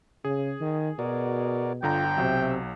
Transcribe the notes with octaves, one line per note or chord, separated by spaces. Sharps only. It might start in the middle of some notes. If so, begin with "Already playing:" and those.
C#3 G#4
D#3
B2 F#4 A#4 D5
G1 D3 F4 G5 A#5
B1 C3 F#3 E5